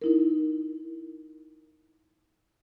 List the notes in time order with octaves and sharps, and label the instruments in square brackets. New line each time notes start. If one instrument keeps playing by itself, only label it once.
[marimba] D#4 E4 A#4